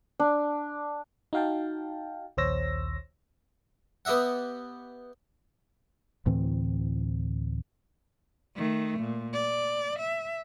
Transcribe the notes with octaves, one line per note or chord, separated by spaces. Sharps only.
D4
D#4 F#4 F5 G5 A5
A#1 D#2 C5 C#5 E6 A#6
B3 G4 D#5 E5 F#5
D2 A2 E3 C4
D#3 A3
A#2
D5
E5